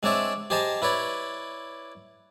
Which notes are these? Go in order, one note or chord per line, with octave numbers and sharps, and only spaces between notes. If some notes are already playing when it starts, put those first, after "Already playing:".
G#3 C4 D4 C#5 D5 E5
G4 G#4 C5 D#5 A5 A#5
E4 B4 C#5 D5